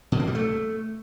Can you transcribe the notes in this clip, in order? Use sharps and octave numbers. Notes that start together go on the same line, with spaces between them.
B2
A#3
G3
A3